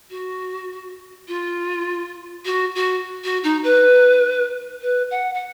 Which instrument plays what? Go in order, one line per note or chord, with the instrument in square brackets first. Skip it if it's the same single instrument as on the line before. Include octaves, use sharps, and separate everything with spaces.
[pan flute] F#4
F4
F#4
F#4
F#4
D#4
B4
B4
F#5
F#5